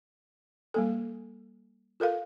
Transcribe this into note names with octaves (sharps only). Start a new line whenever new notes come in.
G3 A#3 A4
F4 A4 A#4 F5